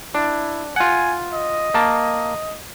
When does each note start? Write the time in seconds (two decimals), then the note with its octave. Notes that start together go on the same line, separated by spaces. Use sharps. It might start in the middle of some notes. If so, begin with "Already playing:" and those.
0.15 D4 E4
0.76 F4 F#5 G#5
1.34 D#5
1.74 A#3 A5